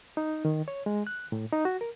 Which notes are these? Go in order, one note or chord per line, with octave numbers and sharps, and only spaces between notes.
D#4
D#3
C#5
G#3
F#6
A2
D#4
F#4
A#4